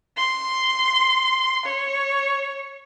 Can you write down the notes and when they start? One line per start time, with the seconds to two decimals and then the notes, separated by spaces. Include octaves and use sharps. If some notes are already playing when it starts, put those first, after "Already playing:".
0.17 C6
1.65 C#5